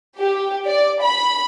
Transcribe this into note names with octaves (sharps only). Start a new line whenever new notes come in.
G4
D5
B5